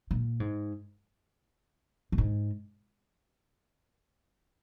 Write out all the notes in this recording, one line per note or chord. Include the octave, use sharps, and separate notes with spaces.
A#2
G#2
A#2
G#2